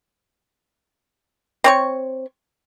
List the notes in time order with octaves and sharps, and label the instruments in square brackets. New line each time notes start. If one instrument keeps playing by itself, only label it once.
[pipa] C4 C#5 C#6